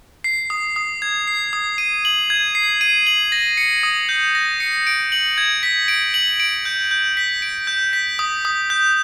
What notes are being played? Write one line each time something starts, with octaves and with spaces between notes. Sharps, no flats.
C7
D#6
D#6
G#6
C7
D#6
D#7
F#7
G#6
C7
D#7
F#7
A#6
C#7
D#6
G6
A#6
C#7
D7
F#7
G#6
B6
D7
F#7
D7
G6
G6
B6
D7
G6
B6
D#6
D#6
G6